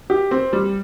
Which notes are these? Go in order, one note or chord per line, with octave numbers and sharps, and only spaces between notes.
G4
C4
G3